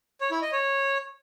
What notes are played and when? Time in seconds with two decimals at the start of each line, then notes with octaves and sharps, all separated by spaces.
0.21 C#5
0.31 E4
0.42 D#5
0.52 C#5